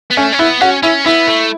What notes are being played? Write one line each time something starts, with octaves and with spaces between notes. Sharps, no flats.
B3
A3 C#4
C#4
B3 E4
C#4 F#4
C#4 E4
B3 E4
A3